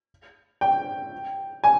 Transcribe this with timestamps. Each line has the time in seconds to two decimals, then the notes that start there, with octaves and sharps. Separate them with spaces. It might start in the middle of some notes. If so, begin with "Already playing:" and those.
0.61 G5
1.64 G#5